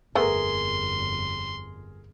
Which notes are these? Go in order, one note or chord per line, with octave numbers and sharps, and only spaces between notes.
G1 F2 A3 B3 G#4 A#4 C6